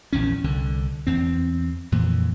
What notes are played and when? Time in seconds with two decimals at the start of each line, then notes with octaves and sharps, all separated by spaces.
0.13 A#1 E2 C#4
0.44 C2 D3
1.07 E2 C4
1.92 F2 A#2 E3